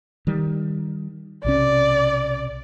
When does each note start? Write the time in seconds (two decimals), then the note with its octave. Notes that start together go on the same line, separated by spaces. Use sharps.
0.27 D#3 G3
1.45 B1 C3 C#4 D5